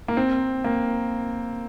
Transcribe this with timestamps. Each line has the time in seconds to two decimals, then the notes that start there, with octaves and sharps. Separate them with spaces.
0.08 A#3
0.17 C4
0.64 A#3